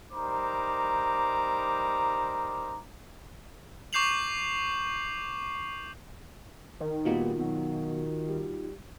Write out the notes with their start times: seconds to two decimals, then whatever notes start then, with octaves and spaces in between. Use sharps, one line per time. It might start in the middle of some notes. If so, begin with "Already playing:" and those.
0.13 G3 D#4 A#4 C5 A#5 D6
3.93 C#6 D6 G6 C7 F7 F#7
6.80 D#3
7.05 A#2 G3 B3 D#4 F4 F#4
7.38 B2 F#3
8.28 G3